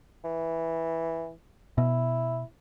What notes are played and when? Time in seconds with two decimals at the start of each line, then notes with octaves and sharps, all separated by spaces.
0.24 E3
1.78 B2 E4